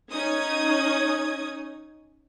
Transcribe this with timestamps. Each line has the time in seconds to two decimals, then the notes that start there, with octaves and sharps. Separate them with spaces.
0.11 C#4 D#4 D#6 G#6